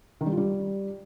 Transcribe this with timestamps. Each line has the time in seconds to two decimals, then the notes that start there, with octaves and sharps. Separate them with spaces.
0.21 D#3
0.26 G3
0.32 F4
0.37 G3